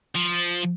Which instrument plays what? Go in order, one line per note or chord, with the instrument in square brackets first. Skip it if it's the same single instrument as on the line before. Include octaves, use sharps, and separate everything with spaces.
[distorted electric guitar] F3